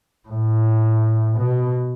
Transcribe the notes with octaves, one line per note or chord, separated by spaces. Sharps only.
A2
B2